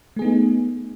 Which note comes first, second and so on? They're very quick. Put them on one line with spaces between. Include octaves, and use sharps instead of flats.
A3 G#4 B3 D#4